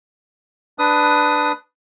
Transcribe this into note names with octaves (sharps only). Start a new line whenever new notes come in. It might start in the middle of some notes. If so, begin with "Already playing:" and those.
D4 B4 D#6